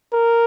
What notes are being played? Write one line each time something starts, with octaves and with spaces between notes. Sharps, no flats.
A#4